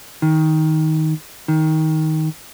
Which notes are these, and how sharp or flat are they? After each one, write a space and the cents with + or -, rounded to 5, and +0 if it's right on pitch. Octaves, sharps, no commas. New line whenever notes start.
D#3 +15
D#3 +15